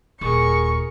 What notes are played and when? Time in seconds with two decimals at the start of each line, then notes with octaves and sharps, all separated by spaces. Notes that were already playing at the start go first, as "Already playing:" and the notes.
0.21 D#1 G#4 A#4 C#6